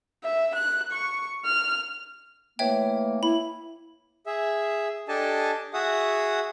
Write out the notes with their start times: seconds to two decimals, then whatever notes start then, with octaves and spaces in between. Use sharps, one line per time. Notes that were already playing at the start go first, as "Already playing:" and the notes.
0.24 E5
0.56 F#6
0.92 C#6
1.45 F6
2.59 E3 A3 A#3 C#5 E5 G5
3.23 E4 B5
4.27 G#4 E5
5.08 D4 G4 A4 D#5 G#5 A5
5.74 F#4 G#4 E5 F#5 D#6